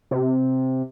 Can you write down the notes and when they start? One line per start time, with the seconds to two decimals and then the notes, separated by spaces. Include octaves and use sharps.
0.11 C3